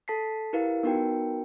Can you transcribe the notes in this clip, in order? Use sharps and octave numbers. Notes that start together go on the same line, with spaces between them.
A4 A5 B6 C7
E4 G4 A#4 B4 F5
B3 D#4 F#4 A#4 B4 G5